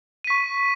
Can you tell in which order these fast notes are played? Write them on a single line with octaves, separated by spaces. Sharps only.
D#7 B6 C#6